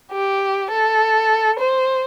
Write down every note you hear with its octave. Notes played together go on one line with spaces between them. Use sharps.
G4
A4
C5